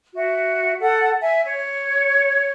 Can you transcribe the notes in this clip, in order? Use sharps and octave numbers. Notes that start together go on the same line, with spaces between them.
F#4 E5
A4 F#5
E5 G#5
C#5